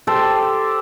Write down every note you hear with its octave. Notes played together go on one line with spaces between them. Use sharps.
G4 A4 C5 G5